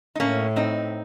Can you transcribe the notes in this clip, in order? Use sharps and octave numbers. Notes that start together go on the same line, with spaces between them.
D#4
A2 A#3 C#4
C4 D#4